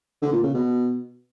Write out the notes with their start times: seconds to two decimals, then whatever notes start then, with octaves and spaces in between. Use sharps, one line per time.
0.22 D3
0.33 A#2
0.44 C#3
0.54 B2